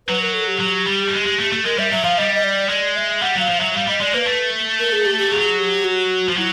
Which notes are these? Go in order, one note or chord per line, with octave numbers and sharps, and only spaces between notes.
F#3 B4
A#4
A4
G4
F#3
G3
A3
G#3
G#3
A3
A3
G#3 A#4
G3 E5
F#3 E5
F3 F5
G3 D#5
D#5
D5
G#3 D5
E5
G3 F#5
F#3 F5
F3
F#3 E5
G3 F5
G3 D#5
G#3 D5
A#3 B4
A3
A#4
G#4
G4
G4
F#3 G#4
G4
F#4
F3
F#3 E4